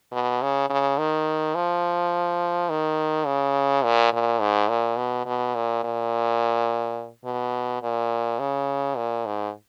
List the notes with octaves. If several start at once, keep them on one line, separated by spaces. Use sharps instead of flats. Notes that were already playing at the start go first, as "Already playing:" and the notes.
B2
C#3
C#3
D#3
F3
D#3
C#3
A#2
A#2
G#2
A#2
B2
B2
A#2
A#2
B2
A#2
C#3
A#2
G#2